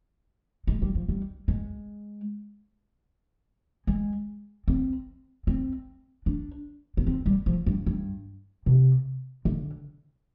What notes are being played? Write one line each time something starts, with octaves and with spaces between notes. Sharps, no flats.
G#3
G3
F3
G3
G#3
G#3
C4
C4
D4
B3
C4
G3
F3
G2
G2
C3
D3